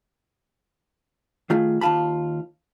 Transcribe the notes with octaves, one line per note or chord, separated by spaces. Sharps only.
D#3 A3 F4 G#4
D#2 G#2 F4 A5 B5